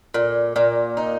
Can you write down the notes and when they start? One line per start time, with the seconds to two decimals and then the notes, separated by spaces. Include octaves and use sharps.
0.14 A#2
0.56 A#2
0.97 D#4